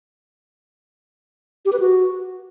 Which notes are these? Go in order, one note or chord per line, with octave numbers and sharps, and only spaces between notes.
G4
B4
F#4